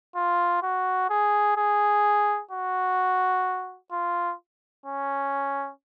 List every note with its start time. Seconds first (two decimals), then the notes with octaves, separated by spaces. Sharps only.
0.16 F4
0.63 F#4
1.10 G#4
1.57 G#4
2.51 F#4
3.92 F4
4.86 C#4